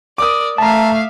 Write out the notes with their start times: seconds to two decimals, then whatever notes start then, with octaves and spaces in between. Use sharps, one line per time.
0.18 A#4 D5 D6 D#6
0.58 A3 E5 F5 A5 A#5